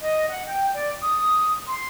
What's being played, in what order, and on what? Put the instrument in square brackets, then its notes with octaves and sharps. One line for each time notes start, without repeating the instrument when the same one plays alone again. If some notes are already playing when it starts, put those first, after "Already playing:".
[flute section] D#5
F#5
G5
D5
D#6
C6